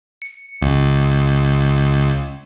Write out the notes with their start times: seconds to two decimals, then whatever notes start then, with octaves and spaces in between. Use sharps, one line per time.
0.22 C#7
0.62 C#2